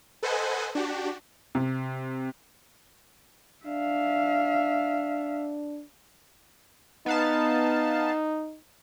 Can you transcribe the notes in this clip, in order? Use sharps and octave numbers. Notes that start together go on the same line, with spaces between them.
A4 B4 C5 D#5 F#5 G#5
D4 F#4 G4
C3
D4 E5 F5
B3 D#4 F5 A5